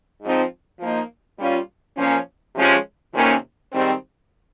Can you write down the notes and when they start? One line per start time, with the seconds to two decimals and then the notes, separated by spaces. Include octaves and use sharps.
0.22 G#2 F3 C4 D#4
0.80 F3 A#3 D#4
1.39 A#2 G3 C#4 F4
1.97 A#2 F3 A#3 C#4
2.55 C3 F3 G#3 C#4 F4
3.14 F2 C3 D#3 A#3 C#4
3.72 G#2 D#3 G3 C4